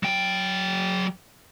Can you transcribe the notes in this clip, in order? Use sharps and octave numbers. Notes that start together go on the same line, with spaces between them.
F#3 G5